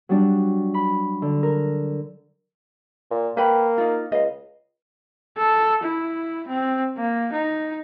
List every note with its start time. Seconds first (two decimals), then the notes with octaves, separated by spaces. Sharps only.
0.09 F#3 G3 D4
0.74 B5
1.22 D3
1.43 A#4
3.11 A#2
3.37 A#3 B4 G5 B5
3.78 D#4 F4
4.12 C#2 D#5 F5
5.37 A4
5.83 E4
6.48 C4
6.97 A#3
7.33 D#4